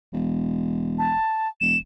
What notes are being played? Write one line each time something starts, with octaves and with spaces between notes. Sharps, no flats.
E1
A5
E1 E7